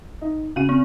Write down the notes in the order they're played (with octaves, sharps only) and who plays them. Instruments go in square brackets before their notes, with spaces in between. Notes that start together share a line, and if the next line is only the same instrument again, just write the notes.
[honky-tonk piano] D#4
[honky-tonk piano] C#3 F#4 D#7 [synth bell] F5
[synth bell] C4